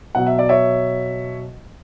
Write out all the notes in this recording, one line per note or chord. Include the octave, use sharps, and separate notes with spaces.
B2 F#3 F#5
E5
D5
C#5 E5